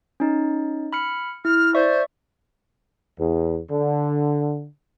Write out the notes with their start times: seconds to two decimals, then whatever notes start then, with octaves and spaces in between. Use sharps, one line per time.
0.20 C#4 D#4
0.93 B5 F6 C#7
1.45 E4 F6
1.75 C5 D5 E5 C#6
3.19 E2
3.70 D3